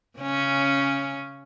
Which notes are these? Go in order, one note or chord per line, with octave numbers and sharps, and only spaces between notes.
C#3 C#4